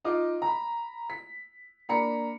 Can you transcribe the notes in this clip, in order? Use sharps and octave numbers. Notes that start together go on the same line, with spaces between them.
D#4 F4 D#5 D6
A#5 B5
B6
A#3 D4 A#5 B5 C#7